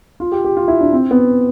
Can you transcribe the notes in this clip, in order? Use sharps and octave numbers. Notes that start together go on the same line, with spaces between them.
F4
G4
G4
F4
E4
D4
C4
B3